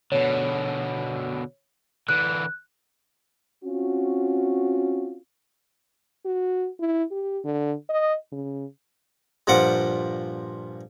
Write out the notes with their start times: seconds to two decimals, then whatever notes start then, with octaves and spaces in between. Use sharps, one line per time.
0.12 B2 D3 C#5
2.09 D3 E3 F#6
3.64 C4 C#4 F4 F#4
6.25 F#4
6.80 E4
7.11 G4
7.44 D3
7.89 D#5
8.32 C#3
9.47 G2 A#2 F3 F#5 D6